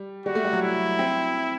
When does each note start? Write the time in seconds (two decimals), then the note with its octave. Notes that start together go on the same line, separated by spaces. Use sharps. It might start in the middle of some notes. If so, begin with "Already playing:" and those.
Already playing: G3
0.26 G3 F#4
0.35 A3
0.44 G3
0.53 F#3
0.62 E4
0.99 C4